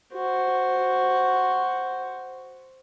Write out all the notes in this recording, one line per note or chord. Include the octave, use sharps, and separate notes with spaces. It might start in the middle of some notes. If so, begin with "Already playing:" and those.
F#4 C5